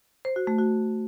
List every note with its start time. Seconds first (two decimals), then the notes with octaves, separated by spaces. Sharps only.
0.25 C5
0.36 F#4
0.47 A3
0.58 F#4